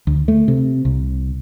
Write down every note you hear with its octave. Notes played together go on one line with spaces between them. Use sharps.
D2
A3
C3
C2